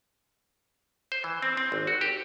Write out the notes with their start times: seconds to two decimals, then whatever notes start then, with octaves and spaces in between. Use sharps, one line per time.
1.12 C5
1.24 E3
1.42 C4
1.57 C4
1.72 G#1
1.87 F#4
2.01 G4